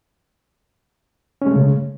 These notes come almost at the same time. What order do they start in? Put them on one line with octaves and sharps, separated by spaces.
C#4 G#3 A3 C#3